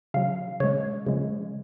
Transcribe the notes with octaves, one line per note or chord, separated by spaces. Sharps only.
C#3 F#3 F5
C#3 G#3 C#5
C#3 F3 G#3